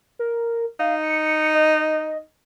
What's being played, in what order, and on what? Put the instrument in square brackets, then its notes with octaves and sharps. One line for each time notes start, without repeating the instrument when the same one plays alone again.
[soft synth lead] A#4
[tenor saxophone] D#4 [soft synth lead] F5
[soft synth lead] C#7
D#5